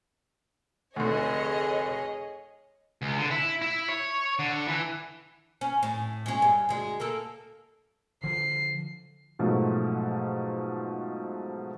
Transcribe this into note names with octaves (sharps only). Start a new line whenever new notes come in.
F1 D2 G#4 C#5 D#5
C#2
D3
E4
E4
C#5
D3
E3
C#4
A2
G#3 C#4
G2
D2 G#3
A#3 A4
D3 F3 C7
G#2 B2 F3 F#3 A3